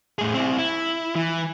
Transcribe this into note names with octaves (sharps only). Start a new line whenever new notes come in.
A2 G#4
C4 E4
E4
E3